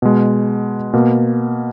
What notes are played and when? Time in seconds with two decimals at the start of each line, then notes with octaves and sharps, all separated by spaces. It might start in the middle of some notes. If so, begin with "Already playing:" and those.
0.02 B2 G#3
0.93 B2 A#3